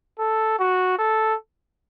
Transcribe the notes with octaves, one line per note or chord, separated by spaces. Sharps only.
A4
F#4
A4